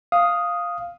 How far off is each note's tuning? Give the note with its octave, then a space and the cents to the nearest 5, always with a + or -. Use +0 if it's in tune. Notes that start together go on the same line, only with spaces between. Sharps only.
F5 +0 D#6 +0